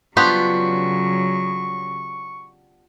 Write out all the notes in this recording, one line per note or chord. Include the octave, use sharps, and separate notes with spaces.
C#3 F#3 B3 D4 F4 G4 C#6